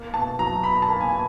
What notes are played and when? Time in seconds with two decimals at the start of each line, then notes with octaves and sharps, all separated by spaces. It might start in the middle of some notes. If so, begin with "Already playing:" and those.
Already playing: A#3
0.14 B2 A5
0.39 F#3 A#5
0.63 B2 B5
0.82 A5
0.88 A#3
1.01 G#5
1.13 B2